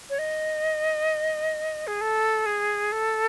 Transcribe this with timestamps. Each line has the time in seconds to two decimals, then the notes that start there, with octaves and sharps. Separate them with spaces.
0.10 C#5
0.19 D#5
1.87 G#4
2.01 A4
2.46 G#4
2.92 A4